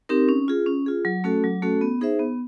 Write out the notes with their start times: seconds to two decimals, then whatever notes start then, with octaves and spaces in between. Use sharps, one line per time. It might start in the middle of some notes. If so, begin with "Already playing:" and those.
0.09 C4 D#4 G4 A#4
0.29 C#4
0.48 F4 G#4
0.66 C#4
0.86 F4 G#4
1.05 F#3
1.24 A3 C#4 F#4 A4
1.44 F#3
1.62 A3 C#4 F#4 A4
1.81 B3
2.01 D#4 G#4 C5 E5
2.19 B3